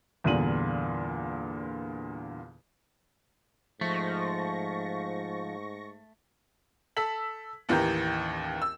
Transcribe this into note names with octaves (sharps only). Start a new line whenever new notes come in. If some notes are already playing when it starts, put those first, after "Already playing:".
E2 G2 A#2 D3 D#7 F#7
G#2 F3 A3 C#6 A#6
A4 E6 B6 F#7
A1 D#2 E3 G4 A#5 G6
E6